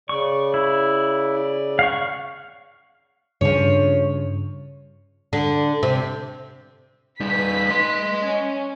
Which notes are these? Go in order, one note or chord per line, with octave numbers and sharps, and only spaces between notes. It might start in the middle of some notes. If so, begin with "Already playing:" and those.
C#3 D5 C#6
E4
F5 F#5 C#6
G2 C#3 F3 C#5
D3
C3
G3 D#4 B4 B6
D#5 C6
C#4